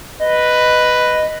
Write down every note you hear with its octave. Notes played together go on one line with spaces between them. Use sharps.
B4 D#5